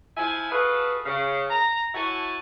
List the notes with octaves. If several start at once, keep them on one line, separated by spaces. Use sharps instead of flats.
F3 E4 E5 G#5
F4 F#4 G#4 A4 B4
C#3
A#5
A3 E4 F#4 C#5 G#5 A5